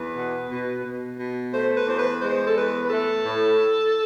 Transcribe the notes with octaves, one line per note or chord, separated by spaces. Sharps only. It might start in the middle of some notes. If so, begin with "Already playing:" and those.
Already playing: E2 B4
B2
B2
B2
B2
A3 C5
B4
E2 C5
B4
G#3 C5
A4
E2 B4
B4
A3 A4
A2